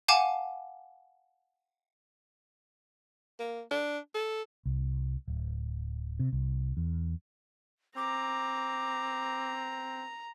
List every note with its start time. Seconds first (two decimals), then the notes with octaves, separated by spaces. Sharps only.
0.08 F5 F#5 G#5 A5 D6
3.39 A#3
3.71 D4
4.15 A4
4.66 C2
5.28 D1
6.19 C3
6.33 C2
6.77 E2
7.97 C4 A#5 D6